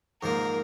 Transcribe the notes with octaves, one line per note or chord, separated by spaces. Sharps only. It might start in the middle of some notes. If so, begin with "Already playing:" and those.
G#2 F3 A#3 A#4